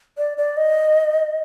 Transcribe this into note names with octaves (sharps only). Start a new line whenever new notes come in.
D5
D5
D#5